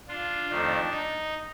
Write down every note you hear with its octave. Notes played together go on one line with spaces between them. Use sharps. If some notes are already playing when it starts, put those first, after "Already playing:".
D4 F4
F2 D#3 A3 D4
D#4